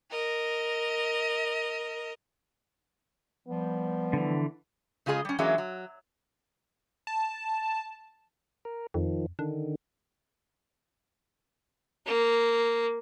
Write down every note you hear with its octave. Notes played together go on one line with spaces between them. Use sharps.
A#4 D#5
F3 G3 B3
D3 E3
C#3 G#3 F4 G#4 D#5
G3 C#4
E3 F#3 G#3 A#3 C#4 E5
F#3
A5
A#4
F2 D#3 F3
D3 D#3 D4
A#3